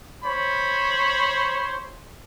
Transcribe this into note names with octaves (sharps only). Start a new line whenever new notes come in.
C5 C#5 B5